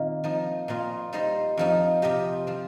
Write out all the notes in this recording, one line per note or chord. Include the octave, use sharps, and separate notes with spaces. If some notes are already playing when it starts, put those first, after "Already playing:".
Already playing: A#2 D#3 A#3 C4
F3 D#4 A#4 D#5
A#2 A#3 F4 D#5
G3 D#4 C5 D#5
F2 F3 D#4
C3 F3 D#4 G4 D#5
F3 C4